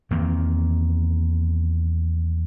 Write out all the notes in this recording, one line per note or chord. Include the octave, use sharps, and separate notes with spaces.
E2 D#3 A#3 C4